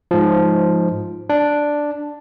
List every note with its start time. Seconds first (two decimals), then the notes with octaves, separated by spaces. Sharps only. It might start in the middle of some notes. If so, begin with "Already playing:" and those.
0.11 G#2 F3
1.30 D4